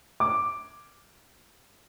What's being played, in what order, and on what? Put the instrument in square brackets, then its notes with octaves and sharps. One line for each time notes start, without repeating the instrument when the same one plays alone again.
[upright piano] D6